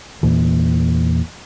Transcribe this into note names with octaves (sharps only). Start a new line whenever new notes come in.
E2 A#2 E3